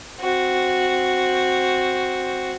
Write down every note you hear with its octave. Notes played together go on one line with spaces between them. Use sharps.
C4 F#4